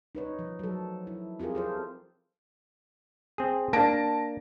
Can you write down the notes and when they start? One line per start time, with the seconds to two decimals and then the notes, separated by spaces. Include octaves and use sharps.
0.15 D#4 B4 C#5
0.39 F3
0.59 F#3 A4
1.07 E4
1.40 C4 F4 G4 G#4 A#4
1.55 F4 A4 C5
3.38 C4 G#4
3.73 A#3 D4 A5 A#6 D7